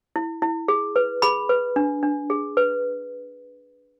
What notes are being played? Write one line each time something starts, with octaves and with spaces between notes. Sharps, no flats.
E4
E4
G#4
B4
G#4 B5
B4
D4
D4
G#4
B4